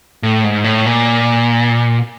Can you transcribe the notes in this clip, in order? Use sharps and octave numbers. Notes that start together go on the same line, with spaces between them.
A2
G#2
A2
A#2